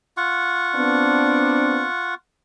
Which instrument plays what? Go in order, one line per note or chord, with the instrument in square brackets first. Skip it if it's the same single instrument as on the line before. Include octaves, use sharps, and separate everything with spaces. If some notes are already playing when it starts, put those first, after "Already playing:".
[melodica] F4 F#5 C#6
[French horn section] B3 C4 D4